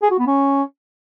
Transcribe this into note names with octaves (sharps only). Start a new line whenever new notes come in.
G#4
F#4
B3
C#4